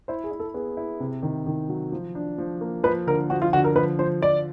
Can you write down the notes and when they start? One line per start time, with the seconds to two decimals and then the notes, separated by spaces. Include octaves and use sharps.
0.08 E4 C5
0.24 G#4
0.31 E4
0.40 A4
0.54 B3 G#4
0.77 E4
1.00 C3
1.23 D#3
1.46 D#3
1.69 F#3
1.92 F3
2.15 D4
2.38 F3
2.61 A#3
2.83 F3 B4
3.07 D3 A#4
3.30 F3 F#4
3.42 F4
3.53 D3 F#4
3.64 A#4
3.75 F3 B4
3.99 F3 C5
4.22 F3 D5